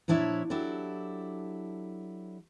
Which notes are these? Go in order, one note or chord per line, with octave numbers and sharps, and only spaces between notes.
A#2 F3 D4 E4 C#5 E5
F#3 D4 E4 G4 A4